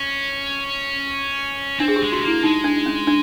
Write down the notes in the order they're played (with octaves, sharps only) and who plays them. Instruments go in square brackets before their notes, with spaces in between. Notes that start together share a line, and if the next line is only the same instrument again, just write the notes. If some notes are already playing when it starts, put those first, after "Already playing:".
Already playing: [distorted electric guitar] C#4
[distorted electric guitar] C4 [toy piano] D4
[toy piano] G#4
G4
[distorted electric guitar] G#3
[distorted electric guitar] A3 [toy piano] F#4
[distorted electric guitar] A#3 [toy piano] E4
[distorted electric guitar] G#3 [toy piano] D#4
[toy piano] D4
C#4
D4